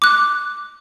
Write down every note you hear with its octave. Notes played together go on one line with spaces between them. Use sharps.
D6 F#6